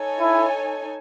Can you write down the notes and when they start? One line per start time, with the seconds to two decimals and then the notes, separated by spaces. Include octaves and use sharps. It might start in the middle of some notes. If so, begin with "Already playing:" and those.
Already playing: D#4 A4 C#5 G#5
0.20 E4